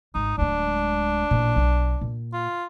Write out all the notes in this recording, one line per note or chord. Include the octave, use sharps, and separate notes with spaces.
G#1 D#4
D1 G#3 D4
A1 A#2
B1
A#2
F4